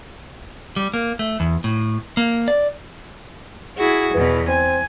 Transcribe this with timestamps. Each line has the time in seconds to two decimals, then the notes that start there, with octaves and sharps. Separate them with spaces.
0.76 G3
0.94 A#3
1.19 A3
1.40 E2
1.64 A2
2.17 A#3
2.48 D5
3.78 E4 F#4 G#4
4.14 E2 B2 E3
4.48 C4 G#5